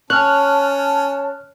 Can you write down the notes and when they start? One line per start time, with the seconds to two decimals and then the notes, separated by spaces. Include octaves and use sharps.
0.10 C#4 C#5 A5 F6 F#6